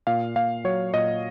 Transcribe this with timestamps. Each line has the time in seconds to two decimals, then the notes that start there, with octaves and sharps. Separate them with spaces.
0.07 A#2 F5
0.36 A#2 F5
0.64 F#3 C#5
0.93 A#2 D#5